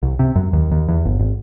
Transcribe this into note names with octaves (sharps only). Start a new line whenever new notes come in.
C2
C3
F#2
D#2
D#2
E2
G1
G#1